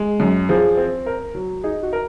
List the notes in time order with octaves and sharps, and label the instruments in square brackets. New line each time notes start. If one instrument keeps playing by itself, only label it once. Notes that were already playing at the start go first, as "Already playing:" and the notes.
Already playing: [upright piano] G#3
F#2
[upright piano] F3 [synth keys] G#4
[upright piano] C4
A#4
F#3
[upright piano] D#4 [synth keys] G#4
[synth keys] F#4
[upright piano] A#4